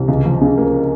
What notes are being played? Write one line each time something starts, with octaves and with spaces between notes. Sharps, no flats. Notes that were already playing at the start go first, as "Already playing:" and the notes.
Already playing: C2
C#2
F3
C#3
A#3